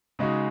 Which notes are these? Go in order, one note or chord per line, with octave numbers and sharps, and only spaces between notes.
C#3 G#3 D#4 F#4